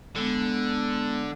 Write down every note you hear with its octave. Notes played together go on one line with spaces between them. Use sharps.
D3 G#3 B3